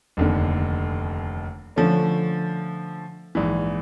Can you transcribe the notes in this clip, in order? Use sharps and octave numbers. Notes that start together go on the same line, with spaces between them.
F1 D#2 D3
D3 F3 A3 C#4
A#1 G#2 E3